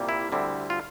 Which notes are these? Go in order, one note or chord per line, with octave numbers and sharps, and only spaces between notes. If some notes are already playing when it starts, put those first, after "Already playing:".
Already playing: C2 A#2 G3 A#3
E4
D2 D3 G3 C4 E4
F4